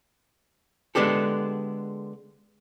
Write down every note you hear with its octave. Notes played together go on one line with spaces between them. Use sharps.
D3 G#3 B3 D4 G4 A4